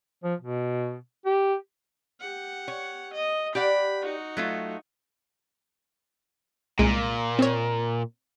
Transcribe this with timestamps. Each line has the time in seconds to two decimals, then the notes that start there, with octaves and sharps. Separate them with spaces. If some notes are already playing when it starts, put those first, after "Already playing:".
0.24 F3
0.40 B2
1.26 G4
2.20 G4 F#5
2.68 C#5
3.13 D#5
3.55 G4 D5 F#5 B5
4.02 D#4 F#4
4.37 F#3 A3 F4
6.79 C2 A#2 G#3
7.39 C4 C#5